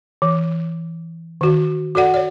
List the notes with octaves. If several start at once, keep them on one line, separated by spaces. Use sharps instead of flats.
E3
D#3 F#4
F#4 A4 D5 F#5
C#5 D5